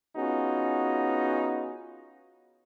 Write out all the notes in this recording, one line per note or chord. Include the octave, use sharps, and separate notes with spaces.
B3 C#4 D#4 F4 F#4 G#4